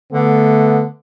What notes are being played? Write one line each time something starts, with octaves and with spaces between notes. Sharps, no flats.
D3 A3 B3